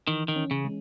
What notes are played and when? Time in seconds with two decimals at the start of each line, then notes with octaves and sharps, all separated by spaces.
0.07 D#3 E3
0.28 D#3
0.36 C#4
0.51 C#3
0.65 G#3